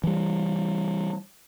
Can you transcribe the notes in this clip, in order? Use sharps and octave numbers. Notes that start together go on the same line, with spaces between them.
E3 G3